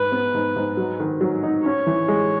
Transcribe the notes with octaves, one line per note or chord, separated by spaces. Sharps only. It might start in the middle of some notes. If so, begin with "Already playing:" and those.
Already playing: G#2 B4
B3
G#2
G#2
F#3
D#3
F#3
D#4
C#4 C#5
E3
G#3